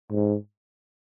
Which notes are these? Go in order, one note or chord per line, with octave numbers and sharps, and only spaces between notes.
G#2